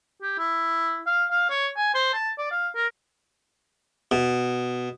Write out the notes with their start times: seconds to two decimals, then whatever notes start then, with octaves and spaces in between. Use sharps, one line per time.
0.22 G4
0.39 E4
1.07 F5
1.31 F5
1.50 C#5
1.77 G#5
1.95 C5
2.14 A5
2.38 D5
2.51 F5
2.75 A#4
4.11 B2